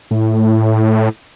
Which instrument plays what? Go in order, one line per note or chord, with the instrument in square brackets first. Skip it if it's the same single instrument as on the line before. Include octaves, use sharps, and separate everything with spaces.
[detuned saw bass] A2